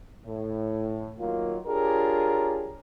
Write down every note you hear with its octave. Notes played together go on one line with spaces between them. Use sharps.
A2
D#3 F#3 A#3 F4
D4 F4 G4 G#4 A#4 C#5